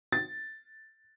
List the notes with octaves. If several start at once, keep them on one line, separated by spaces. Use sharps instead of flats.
A6